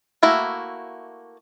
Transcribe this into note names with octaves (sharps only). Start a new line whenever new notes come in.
A3 A#3 E4 F#4